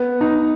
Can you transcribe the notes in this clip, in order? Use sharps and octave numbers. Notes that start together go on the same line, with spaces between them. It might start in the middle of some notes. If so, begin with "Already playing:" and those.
Already playing: B3
D#4